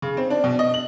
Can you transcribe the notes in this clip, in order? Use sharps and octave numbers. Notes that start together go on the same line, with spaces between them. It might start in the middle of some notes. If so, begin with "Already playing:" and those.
C#3
C4
D4
B2
D#5
F#7